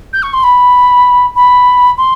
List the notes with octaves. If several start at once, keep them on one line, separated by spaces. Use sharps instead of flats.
G6
C#6
C6
B5
B5
C6